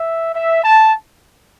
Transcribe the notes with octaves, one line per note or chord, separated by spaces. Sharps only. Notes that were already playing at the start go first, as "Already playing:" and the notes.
Already playing: E5
E5
A5